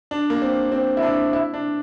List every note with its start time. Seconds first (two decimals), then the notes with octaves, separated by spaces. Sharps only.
0.11 D4
0.30 A#3
0.42 C4
0.72 C4
0.97 E4
1.02 D4
1.33 E4
1.54 D4